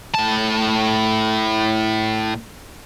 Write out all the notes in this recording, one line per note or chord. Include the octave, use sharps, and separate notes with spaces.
A2 A5